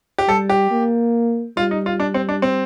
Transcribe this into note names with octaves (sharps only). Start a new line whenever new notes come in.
G4
G3 A4
G4
A#3
G3 F4
D#4
F4
D4
C4
D4
C4